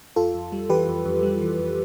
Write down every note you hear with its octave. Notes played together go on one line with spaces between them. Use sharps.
F2 F4 A4
F2
G3
E3 G4 B4
F2
F2
G3
E3
F2